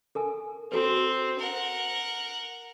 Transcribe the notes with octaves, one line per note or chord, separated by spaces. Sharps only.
A4 A#4 G#5
C4 F#4 A4 B4
A#4 F#5